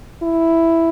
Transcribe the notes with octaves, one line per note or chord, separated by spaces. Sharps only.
E4